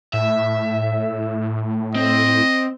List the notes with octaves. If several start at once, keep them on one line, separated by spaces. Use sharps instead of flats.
A2 E5
C4 D#5